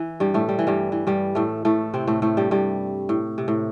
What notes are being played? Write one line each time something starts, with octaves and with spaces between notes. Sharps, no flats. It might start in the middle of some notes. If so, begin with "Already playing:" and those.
Already playing: E3
G2 G3
A2 A3
G3
E3
G2 G3
E3
G2 G3
A2 A3
A2 A3
C3 C4
A2 A3
A2 A3
G2 G3
G2 G3
A2
C3
A2